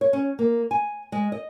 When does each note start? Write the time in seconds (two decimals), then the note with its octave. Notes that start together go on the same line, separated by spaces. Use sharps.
0.01 C#5
0.13 C#4
0.39 A#3
0.71 G#5
1.12 G#3
1.32 D#5